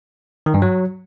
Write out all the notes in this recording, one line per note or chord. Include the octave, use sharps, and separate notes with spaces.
D#3
G2
F#3